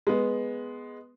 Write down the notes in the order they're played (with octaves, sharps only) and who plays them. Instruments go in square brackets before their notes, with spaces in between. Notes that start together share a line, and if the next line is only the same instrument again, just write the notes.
[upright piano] G#3 B3